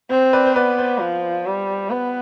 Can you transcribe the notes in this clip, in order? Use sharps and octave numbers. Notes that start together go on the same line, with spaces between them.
C4 C5
B4 D5
C5
B3 B4 D5
C5
F3
G3
B3 B4